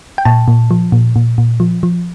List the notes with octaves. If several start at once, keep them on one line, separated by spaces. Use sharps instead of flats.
G5
A#2 A5
A#2
F3
A#2
A#2
A#2
F3
F3